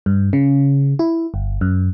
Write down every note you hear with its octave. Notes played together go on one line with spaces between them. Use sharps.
G2
C#3
E4
G1
F#2